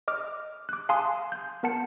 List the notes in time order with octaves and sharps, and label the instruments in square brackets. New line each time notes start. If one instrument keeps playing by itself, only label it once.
[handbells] D#5 D6 F6
D6 F#6
F5 G#5 A5 C6 D#6
G6
B3 A#4 F#5 A5 C#7